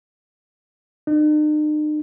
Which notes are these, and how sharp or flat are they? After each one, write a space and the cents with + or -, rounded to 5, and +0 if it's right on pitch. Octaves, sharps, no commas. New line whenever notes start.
D#4 -45